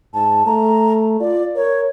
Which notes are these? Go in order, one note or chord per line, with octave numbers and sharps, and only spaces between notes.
G#2 A5
A3 A#5
F4 D5
A#4 C#5